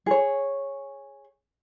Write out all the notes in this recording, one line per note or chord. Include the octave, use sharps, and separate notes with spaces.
G#4 C#5